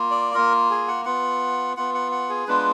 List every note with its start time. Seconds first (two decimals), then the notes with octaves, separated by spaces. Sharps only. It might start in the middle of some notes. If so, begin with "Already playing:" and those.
Already playing: A#3 F4
0.11 D5
0.34 A#3 F4 A#4
0.70 G#4
0.88 F#5
1.05 B3 F4 F#5
1.77 B3 F4 F#5
1.94 F#5
2.12 F#5
2.30 G#4
2.48 G#3 B3 D4 F4 B4